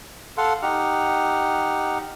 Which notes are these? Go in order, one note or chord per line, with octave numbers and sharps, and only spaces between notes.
A4 F5 F#5 C6
D#4 G4 F#5 F6